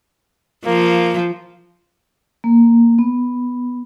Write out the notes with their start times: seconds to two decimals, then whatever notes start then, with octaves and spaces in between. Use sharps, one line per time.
0.65 F3 A#3
2.44 A#3
2.99 B3